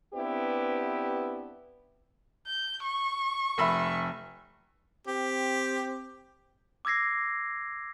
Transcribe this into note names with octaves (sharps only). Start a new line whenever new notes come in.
B3 C4 D4 E4 G4 B4
G6
C#6
F1 E5 B5
C4 G4
D6 E6 G#6 A#6 C7